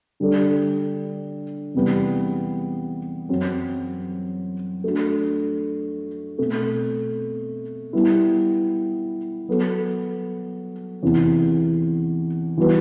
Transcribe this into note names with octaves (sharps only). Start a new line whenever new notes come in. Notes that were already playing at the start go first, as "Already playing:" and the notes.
D3 G3 D4 A4 D5
E2 C3 G3 B3
F#2 F#3 C4
A3 D4 F#4
B2 A3 C4
G3 B3 E4
F#3 B3 F#4 A4
E2 C3 E3
E3 G3 B3 F#4 B4